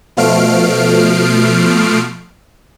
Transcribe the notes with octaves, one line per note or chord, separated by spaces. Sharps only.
B2 F3 A3 F6 C7 D7